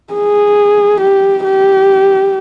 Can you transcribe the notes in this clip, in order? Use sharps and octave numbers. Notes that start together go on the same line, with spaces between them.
G#4
G4
G4